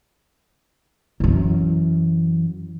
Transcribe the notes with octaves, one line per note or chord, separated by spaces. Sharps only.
F#2 E3